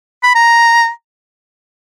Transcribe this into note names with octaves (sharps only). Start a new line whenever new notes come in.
B5
A#5